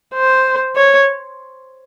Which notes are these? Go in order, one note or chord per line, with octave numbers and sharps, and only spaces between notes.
C5
C#5